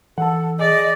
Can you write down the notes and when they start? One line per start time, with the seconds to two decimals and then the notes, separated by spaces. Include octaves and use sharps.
0.18 E3 A4 F#5 A5
0.59 G#4 D5 D#5